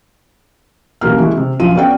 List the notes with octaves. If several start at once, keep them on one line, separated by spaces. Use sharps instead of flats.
A1 B2 F#3 A#3 F6
E3 G#3 F#4
C3
A#1 F#2 F3 F4 D#7
B3 C#4 F#4 D5 F#5 G5